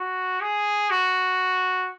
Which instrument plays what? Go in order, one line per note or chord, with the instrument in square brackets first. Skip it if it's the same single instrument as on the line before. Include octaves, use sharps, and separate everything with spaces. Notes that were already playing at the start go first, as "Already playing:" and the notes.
Already playing: [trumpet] F#4
G#4
F#4